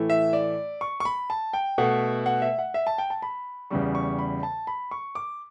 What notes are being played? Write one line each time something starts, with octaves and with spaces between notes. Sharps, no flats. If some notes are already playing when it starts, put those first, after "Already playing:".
Already playing: A2 E3 A3
E5
D5
C#6
C#6
B5
A5
G5
B2 A3 F#5
F#5
E5
F#5
E5
A5
G5
A5
B5
E2 C#3 G3 C#6
C#6
B5
A5
B5
C#6
D6